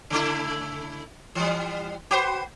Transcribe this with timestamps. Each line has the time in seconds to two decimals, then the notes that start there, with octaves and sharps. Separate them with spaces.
0.10 C#3 A3 E4
1.35 E3 G3
2.11 F#4 B4 C5